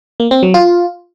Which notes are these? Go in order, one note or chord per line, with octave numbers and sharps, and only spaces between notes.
A#3
C4
F#3
F4